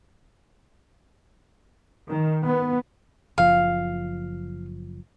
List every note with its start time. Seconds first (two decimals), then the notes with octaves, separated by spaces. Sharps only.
2.08 D#3
2.44 B3
3.38 F#1 F3 F5